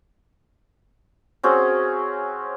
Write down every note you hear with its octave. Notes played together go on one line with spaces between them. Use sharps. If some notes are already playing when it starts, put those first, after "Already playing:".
C4 C#4 F#4 G#4